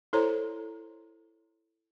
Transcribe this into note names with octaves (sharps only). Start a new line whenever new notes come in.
E4 A4 C5 C#5 A#5